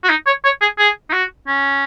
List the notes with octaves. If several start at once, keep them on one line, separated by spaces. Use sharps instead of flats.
F#4
D#4
C#5
C#5
G#4
G#4
D#4
F#4
C#4